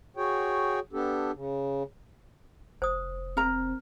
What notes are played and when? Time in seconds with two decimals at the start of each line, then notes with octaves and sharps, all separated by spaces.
0.17 F#4 G#4 C#5 G5
0.93 B3 D4 G4 A4
1.34 C#3
2.82 F1 C5 D#6
3.37 C4 A#4 A#5